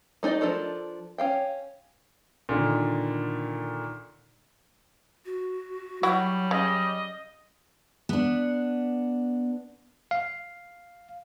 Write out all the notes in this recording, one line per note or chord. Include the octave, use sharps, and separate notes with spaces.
A3 D#4 G#4 D5 D#5
F3 D4 A4 A#4
C#4 F5 G5
A#2 D3 D#3
F#4
F#3 G3 E4 F#4
C#3 D#5
B3 D4
F5